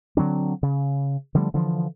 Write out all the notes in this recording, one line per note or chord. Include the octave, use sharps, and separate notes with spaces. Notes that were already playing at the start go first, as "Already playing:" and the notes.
D3 F#3 C4 D4
C#3
D3 F3 G3 A3
D3 E3 F3